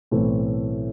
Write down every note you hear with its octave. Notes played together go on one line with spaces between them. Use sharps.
B1 A2 E3 A3 C4